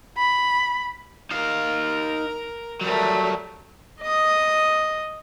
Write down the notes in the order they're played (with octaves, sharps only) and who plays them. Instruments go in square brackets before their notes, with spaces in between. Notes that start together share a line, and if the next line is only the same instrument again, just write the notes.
[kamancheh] B5
[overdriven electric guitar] D#4 F5 [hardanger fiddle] A#4
[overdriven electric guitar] F#3 G3 [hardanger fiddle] A3 A#4
[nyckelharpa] D#5 D#6